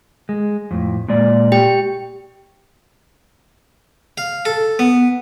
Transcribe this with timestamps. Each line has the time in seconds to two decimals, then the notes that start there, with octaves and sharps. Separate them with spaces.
0.29 G#3
0.71 F2 A2
1.08 A#2 G#3 D5
1.52 G4 G5
4.18 F5
4.45 A4
4.79 B3